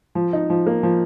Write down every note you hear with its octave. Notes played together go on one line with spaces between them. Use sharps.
F3
D#4
F3
A#3
F3